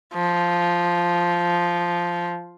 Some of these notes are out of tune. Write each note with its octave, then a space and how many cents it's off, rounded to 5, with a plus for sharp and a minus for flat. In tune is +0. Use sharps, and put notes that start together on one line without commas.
F3 -5